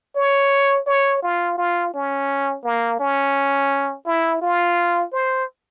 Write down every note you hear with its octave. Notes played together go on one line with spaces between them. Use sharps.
C#5
C#5
F4
F4
C#4
A#3
C#4
E4
F4
C5